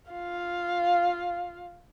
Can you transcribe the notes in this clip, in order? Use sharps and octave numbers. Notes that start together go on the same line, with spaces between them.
F4 F5